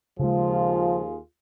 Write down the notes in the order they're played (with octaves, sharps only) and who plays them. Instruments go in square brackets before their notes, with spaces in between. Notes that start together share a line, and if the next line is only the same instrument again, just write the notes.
[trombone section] D#2 F4 G#4 [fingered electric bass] C#3 G#3 [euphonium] F3